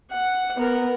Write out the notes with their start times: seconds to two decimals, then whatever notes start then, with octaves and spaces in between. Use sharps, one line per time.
0.10 F#5
0.57 B3 A#4